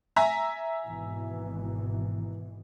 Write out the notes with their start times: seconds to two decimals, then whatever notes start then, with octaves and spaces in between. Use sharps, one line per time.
0.16 E5 G#5 A#5
0.83 G#1 B2 E3